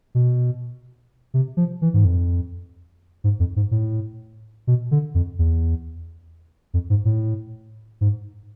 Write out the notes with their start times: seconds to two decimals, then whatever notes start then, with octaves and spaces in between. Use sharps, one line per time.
0.15 B2
1.34 C3
1.57 F3
1.82 E3
1.94 G#2
2.05 F2
3.24 G#2
3.40 F2
3.56 G#2
3.71 A2
4.67 B2
4.91 D3
5.15 F2
5.39 E2
6.74 F2
6.90 G#2
7.05 A2
8.01 G#2